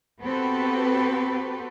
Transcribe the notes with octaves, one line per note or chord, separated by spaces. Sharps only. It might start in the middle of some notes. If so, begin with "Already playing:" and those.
B3 C4 F#4 G4 A4 B4